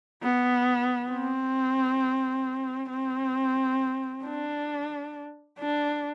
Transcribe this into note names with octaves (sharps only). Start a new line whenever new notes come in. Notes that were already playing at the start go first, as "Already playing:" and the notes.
B3
C4
C4
D4
D4